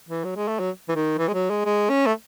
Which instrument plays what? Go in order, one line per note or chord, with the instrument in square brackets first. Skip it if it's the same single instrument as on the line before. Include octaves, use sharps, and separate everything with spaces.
[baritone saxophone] E3
F#3
G#3
A3
F#3
E3
D#3
E3
G#3
F#3
G#3
G#3
C#4
A3